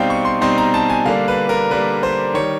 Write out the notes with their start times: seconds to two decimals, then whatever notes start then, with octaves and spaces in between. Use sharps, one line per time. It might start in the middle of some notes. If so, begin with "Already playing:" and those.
Already playing: B2 G3 C4 D#4 F5 G5
0.10 C#6
0.25 C6
0.41 B2 G3 C4 D#4 C6
0.58 A#5
0.74 A5
0.90 G#5
1.05 D3 G3 A#3 D4 F5
1.28 B4
1.49 A#4
1.70 D3 G3 A#3 D4 B4
2.03 C5
2.34 D#3 G3 C#5